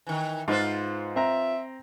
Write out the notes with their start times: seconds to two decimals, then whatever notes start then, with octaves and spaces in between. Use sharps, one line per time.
0.07 D#3 E3
0.48 G#2 F4 B4 C5
1.16 C4 E5 A#5